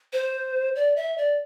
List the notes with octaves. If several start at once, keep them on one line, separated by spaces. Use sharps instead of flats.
C5
D5
E5
D5